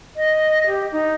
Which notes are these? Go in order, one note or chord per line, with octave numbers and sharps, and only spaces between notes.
D#5
G4
D#4